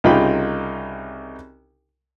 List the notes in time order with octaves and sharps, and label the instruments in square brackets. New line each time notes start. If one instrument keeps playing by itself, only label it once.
[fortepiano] C2 C#3 D#4 F4 G5 B5